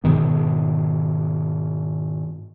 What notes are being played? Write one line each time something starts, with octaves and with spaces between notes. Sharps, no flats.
G#2 B2 D#3 B3